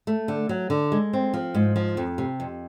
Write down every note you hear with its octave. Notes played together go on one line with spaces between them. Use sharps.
A3
D3
F#3
D3
G#3
C4
F3
G#2
F3
F2
C3
F2